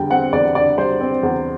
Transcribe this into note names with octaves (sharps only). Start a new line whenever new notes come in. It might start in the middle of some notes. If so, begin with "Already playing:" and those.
Already playing: E2 D3 G3 G5
C4 F#5
E2 D5
D3 D5
G3 C5
C4
E2